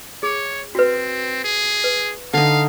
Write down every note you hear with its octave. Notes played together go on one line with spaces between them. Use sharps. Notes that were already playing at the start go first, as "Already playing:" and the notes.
G#4 C#5
C4 F#4 B4
G#4
B4
D3 D#4 F5